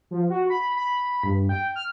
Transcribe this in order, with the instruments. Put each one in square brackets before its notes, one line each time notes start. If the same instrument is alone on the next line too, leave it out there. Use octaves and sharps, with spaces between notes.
[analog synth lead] F3
F#4
B5
B5
G2
G5
F6